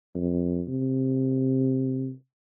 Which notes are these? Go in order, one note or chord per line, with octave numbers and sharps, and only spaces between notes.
F2
C3